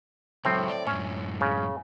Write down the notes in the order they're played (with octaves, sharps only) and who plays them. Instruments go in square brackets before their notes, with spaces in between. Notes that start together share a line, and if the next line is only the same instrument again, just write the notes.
[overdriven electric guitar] C#2 F#3 [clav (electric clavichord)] A2 C4
[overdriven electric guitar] D5
[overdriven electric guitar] F#2 A2 [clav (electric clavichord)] C#4
[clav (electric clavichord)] C#3